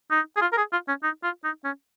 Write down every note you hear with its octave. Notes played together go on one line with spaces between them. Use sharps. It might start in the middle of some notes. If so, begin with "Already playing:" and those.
D#4
G#4
F4
A#4
G#4
F4
C#4
D#4
F4
D#4
C#4